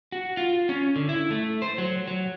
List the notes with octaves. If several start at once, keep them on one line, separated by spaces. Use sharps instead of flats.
F#4
F4
C#4
D3
E4
A3
C5
F#3
F#3